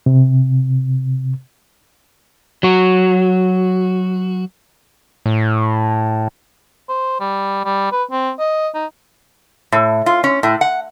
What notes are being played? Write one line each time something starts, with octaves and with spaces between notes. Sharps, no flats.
C3
F#3 F#4
A2
C5
G3
G3
B4
C4
D#5
D#4
A2
F4
C#4
A2
F#5